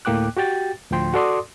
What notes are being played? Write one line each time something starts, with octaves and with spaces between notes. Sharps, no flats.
D2 A2 A#3 G5 D6 F#6
F#4 G4 G5 A6
D2 A2 F3 G5 C6
F#4 A4 D5 C6 D6 D#6